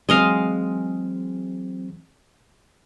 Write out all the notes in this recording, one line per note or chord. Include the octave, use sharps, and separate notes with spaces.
E3 F#3 G#3 C4 D#5 F5